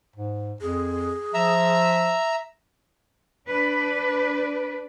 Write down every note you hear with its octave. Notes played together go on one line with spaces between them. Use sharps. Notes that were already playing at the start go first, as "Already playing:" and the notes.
G#2
F2 G#4
F3 E5 A#5 E6
D4 B4 D5